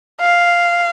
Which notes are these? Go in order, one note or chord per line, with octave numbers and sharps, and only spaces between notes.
F5